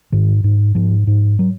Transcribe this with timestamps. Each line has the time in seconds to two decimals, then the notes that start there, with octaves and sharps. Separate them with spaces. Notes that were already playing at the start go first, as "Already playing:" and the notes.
0.12 G#2 D#3
0.44 G#2
0.75 G#2 F3
1.07 G#2
1.39 F#3